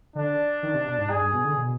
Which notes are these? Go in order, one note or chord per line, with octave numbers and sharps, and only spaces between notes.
D3 D4
D#3
C3
B2
G#2
G2 G#4
G2
B2
D3
B2